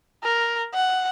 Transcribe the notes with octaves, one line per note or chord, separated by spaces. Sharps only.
A#4
F#5